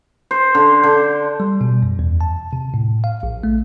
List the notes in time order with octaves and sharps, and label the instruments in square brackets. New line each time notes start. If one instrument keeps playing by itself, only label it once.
[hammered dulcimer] C5
D3
D3
[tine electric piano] G3
B2
F#2
E2
A5
C3
A2
F5
A#1
A3